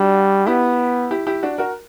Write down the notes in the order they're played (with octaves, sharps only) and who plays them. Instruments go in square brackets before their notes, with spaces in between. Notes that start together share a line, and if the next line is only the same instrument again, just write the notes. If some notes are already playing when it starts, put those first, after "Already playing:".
Already playing: [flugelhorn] G3 [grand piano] D4 F#4
[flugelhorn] B3 [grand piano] E4 G4
[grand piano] E4 G4
E4 G4
D4 F#4
F#4 A#4